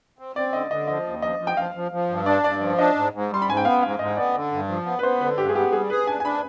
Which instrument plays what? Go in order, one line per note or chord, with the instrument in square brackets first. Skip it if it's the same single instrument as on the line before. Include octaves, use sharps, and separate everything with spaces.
[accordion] C4
[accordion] C4 [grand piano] D5
[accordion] D3 [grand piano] D#5
[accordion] D3 [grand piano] D#5
[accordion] F3 [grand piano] D#5
[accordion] D#2
[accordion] F3 [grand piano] D#5
[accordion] F3
[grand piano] G5
[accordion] F3 [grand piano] F5
[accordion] F3
F3
G2
[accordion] D4 [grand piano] D5
[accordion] G2 [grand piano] D5
[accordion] F3 [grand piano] D5
[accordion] D4 [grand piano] D#5
[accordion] G#2
G#2
[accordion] G3 [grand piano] C6
[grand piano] B5
[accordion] G#2 [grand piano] G#5
[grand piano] G5
[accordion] B3 [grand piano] F5
[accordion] G#2 [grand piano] F5
[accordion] G#2 [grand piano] D#5
[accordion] B3 [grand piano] D5
[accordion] D3
G2
F3
B3
[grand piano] B4
[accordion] B3 [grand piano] C5
[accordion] D3 [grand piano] B4
[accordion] G2 [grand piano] G4
[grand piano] G#4
[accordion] B3 [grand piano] G4
[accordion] G3 [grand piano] G#4
[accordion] G#4 [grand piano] B4
[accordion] D4 [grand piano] G#5
[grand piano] G#5
[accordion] D4 [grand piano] B5